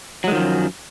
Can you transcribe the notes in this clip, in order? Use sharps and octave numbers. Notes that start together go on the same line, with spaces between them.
F#2 D#3 F3 F#3 G#3